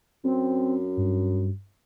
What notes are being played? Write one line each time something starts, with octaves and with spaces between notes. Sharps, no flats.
F#2 C4
G2